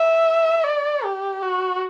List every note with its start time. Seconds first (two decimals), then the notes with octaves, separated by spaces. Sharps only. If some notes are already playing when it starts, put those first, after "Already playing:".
Already playing: E5
0.64 D5
1.04 G4
1.43 F#4